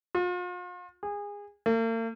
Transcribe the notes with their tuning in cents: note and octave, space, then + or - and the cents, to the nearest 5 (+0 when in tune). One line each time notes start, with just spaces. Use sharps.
F4 +40
G#4 -25
A#3 -45